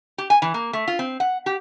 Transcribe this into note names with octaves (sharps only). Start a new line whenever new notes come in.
G4
G#5
E3
A#3
A3
F4
C4
F#5
G4